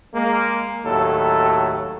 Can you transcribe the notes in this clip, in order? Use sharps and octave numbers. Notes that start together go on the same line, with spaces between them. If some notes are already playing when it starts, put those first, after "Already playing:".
G#3 A#3
D#2 A2 F#3 A4